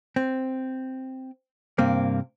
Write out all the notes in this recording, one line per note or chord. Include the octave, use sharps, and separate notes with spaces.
C4
G2 C3 A#3 C4